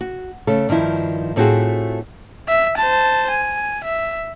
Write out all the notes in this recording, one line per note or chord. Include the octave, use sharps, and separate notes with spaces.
F#4
C#3 A3 A4
G2 D#3 F3 E4
A2 A3 C4 F4 F#4 G#4
E5
C5 A5
G#5
E5